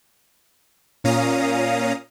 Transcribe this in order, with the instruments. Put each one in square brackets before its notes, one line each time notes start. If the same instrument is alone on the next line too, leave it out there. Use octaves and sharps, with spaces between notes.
[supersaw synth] A#2 C#4 F5 A#5 D#6